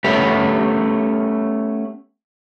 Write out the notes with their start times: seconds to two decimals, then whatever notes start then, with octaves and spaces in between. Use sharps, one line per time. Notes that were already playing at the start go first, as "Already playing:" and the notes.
0.04 A3 B3 C#4 G4 B4